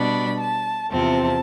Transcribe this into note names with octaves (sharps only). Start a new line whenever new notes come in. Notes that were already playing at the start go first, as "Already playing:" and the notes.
Already playing: B2 G3 D4 B5
A5
E2 C3 F3 C4 A5